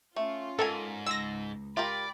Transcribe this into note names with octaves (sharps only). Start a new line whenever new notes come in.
A3 C#4 F4
G#2 A4 A#4 D#5 G#5
C#2 G#3 E6 A#6
F4 G4 A#4 D5 G5 B5